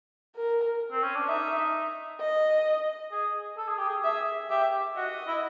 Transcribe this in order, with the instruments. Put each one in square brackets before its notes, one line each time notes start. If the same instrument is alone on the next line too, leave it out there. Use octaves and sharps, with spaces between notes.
[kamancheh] A#4
[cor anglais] C4
C#4
D4
[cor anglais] D#4 [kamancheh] E5
[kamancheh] D#5
[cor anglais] G#4
A4
G#4
G4
G#4
[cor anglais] G#4 [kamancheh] E5
[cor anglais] G4 [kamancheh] E5
[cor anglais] F#4 [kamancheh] D#5
[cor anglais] E4